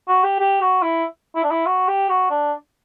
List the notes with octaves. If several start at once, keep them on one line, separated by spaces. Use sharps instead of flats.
F#4
G4
G4
F#4
E4
E4
D4
E4
F#4
G4
F#4
D4